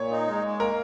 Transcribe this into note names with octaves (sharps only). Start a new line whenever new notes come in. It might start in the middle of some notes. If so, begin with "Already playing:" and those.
Already playing: A#2 C#5
D#4
G#3
G#3
A#3 A#4